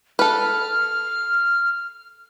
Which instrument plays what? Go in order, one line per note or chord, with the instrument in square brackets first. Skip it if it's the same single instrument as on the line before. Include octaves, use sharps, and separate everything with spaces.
[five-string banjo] A4 B4 [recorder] F6